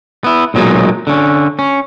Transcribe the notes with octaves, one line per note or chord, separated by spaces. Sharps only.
B3 E4
B1 A#2 F#3 G#3 D#4
D3 C#4
C#4